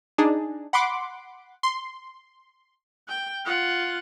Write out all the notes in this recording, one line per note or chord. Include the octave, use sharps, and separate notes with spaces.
D4 D#4 G#4
F#5 B5 C6 D6
C6
G5
F4 F#5